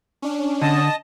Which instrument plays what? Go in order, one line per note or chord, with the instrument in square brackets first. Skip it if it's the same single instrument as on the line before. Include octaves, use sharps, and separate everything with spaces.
[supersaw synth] C#4 D4
[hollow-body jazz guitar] D3 [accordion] D#5 A5 D#6